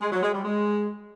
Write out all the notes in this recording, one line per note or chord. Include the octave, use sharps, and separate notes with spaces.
G#3
F#3
G#3
G3
G#3